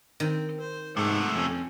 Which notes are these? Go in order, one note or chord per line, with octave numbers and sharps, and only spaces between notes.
D#3 C4
C5
G#2 C3 A3 F#5
F2 C4 C#4